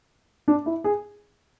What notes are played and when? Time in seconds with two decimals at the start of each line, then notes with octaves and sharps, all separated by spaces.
0.48 D4
0.66 E4
0.84 G#4